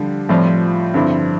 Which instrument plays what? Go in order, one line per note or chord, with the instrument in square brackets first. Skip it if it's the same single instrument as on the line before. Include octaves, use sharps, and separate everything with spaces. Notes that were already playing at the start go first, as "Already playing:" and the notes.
Already playing: [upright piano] D3 F3 [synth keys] G3
[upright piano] A2 G3 C4 [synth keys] F3
[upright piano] G2 D3 G3 C4 E4